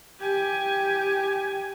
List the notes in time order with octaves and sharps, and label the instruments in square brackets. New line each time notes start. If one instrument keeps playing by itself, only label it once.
[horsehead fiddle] G4 G#5